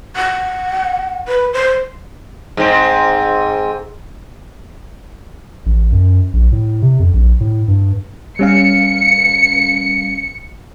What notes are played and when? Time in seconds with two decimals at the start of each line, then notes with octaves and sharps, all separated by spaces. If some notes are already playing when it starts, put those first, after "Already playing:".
0.16 F#5
1.28 B4
1.53 C5
2.57 G#2 C4
5.66 A1
5.92 F#2
6.33 A#1
6.52 A2
6.82 C3
6.99 F2
7.13 A#1
7.40 A2
7.68 G2
8.39 G3 C#4 F5 C#7